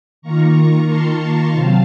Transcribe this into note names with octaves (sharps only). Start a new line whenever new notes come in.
D#3 A#3 F4 A#5 C#6
A5 C6
C3 F#3 C4 F4 F5 A5